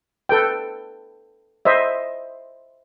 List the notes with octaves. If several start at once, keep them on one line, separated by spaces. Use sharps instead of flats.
A4 B4 G5
C5 D#5 E5